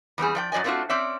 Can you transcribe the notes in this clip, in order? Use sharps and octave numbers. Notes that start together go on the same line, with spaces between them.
E2 G3 C4 G#4
F3 D5 G5
F#2 F#3 D5 D#5 G#5
A3 A#3 C4 D4 F4 F#4
C4 C#4 D5 E5